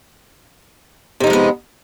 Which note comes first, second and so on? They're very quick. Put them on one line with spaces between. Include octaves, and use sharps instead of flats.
C3 D#4 F3 G#3 B3